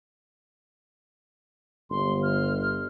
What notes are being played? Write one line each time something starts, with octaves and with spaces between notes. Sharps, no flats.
G1 C6
F6